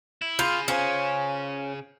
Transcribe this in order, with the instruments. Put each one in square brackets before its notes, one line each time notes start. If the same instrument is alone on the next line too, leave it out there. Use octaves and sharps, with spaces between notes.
[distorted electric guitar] E4
[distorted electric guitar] C#3 G#4 [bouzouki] F4 [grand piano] B5 G6 C7
[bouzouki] C#4 [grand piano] F4 C5 G#5